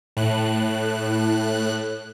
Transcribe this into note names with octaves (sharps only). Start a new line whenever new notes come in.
A2 F#6